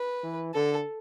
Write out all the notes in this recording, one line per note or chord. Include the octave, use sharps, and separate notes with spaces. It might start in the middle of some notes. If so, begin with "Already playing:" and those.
Already playing: B4
E3
D3 A4